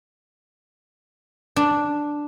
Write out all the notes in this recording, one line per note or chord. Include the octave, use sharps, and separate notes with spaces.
D4